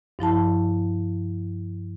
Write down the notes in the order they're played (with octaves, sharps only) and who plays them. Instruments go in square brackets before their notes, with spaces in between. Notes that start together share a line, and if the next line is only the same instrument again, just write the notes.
[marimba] G2 F3 E4 A5